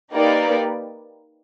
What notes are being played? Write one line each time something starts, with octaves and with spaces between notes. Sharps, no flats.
A#3 D#4 G4 B4 D5